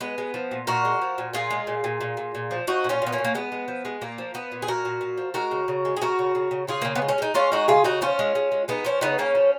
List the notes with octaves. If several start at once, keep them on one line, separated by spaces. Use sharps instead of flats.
G#3 B3
G#3
F3
A#2
A#2 F#4 A#4
G#3
F3
A#2
A#2 F4 G#4
G#3
A#2
A#2
A#2
A#2
A#2
F3
F3 D#4 F#4
A#2
C#4 F4
A#2 B3
A#3 C#4
A#2
A#3
G#3 B3
G#3
F3
G#3
A#2 A#3
F3
F3 B3
A#2
G#4
A#2 F#4 A#4
A#2
A#2
F3
G#3 F#4 A#4
C#3
C#3
G#3
G#4
C#3 F#4 A#4
C#3
C#3
C#3
C#3 F4 G#4
C#3 A#3
B3
G#3
C#4
G#3 D#4
G#3 C#4 F4
G#3 D#4 F#4
C#3 F4 G#4
C#3 D#4 F#4
F3 C#4 F4
G#3
G#3
G#3
G#3 B3 D#4
F3 C#4 F4
C#3 B3 D#4
C#3 A#3 C#4
F3